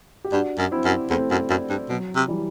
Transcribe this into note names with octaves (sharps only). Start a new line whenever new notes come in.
G4
G2 D4 F#4
F#2
C4 E4
F#2
E2 A3 C4
F#2
F#2
G2
B2 F#3
C3
E3 G3